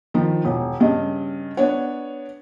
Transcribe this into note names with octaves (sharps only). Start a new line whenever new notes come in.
D#3 F3
E1
G2 C#3 D#5
B3 D4 C#5